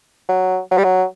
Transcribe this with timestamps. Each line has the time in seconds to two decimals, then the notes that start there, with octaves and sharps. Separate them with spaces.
0.29 F#3
0.71 F#3
0.78 G3
0.84 F#3